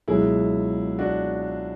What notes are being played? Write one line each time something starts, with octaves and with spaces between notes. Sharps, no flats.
C#2 B2 F#3 E4 G#4
D4 F#4